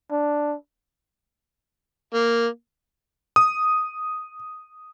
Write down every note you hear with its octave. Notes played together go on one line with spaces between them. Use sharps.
D4
A#3
D#6